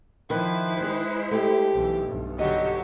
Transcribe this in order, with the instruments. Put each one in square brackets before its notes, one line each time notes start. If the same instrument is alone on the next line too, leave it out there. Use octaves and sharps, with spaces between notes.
[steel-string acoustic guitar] D#3 [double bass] F3 [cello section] E4 C5 [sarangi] B4
[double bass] G#3
[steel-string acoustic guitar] A3 [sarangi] G4
[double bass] B1 E3
B1 G2
[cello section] D3 G4 [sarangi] F#3 [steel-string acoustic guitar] D#5